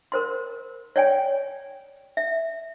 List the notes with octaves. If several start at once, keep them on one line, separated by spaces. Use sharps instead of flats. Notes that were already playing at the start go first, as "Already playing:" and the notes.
A#4 C5 C6
C#5 D5 G5 G#5
E5